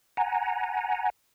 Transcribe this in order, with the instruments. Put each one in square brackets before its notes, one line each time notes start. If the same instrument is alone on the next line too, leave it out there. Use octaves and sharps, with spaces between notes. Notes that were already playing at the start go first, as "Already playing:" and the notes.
[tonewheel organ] F#5 G#5 A#5